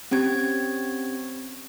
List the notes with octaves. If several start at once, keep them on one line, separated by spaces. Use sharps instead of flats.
C4 C#4 G4 G#6